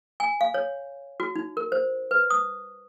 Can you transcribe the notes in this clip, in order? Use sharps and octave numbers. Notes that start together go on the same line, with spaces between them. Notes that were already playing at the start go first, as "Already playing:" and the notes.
G#5
F5
C#5
F#4
D#4
A#4
C5
B4
D#6